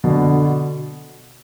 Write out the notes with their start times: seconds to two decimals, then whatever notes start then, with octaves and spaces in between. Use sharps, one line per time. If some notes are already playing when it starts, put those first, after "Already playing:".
0.04 B2 D3